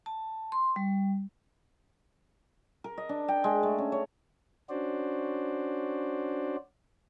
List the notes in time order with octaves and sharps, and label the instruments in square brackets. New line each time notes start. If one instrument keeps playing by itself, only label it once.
[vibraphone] A5
C6
G3
[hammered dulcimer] A#4
D#5
D4
G5
G#3
A3
C#4
C#5
[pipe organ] C#4 D4 F#4 C5 D5